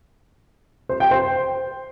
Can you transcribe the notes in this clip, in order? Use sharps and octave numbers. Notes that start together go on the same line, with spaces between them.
C5
G5
C5